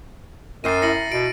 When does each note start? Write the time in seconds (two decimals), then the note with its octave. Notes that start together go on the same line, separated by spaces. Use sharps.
0.64 F#2 A#4 D#5 G5 A6 C7 D#7
0.82 E4 A#6 C#7 F#7
1.12 B2 D7